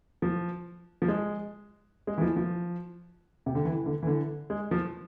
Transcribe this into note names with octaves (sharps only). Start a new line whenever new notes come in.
F3
F3
G#3
G#3
E3
F3
F3
C3
D3
E3
D3
E3
D3
G#3
F3